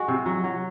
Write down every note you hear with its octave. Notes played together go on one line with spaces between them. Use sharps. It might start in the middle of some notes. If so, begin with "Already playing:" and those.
Already playing: G#3 F#4
C3
F#3
F#3